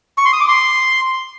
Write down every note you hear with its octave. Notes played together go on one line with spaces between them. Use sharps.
C#6
C6
D#6
D6
C6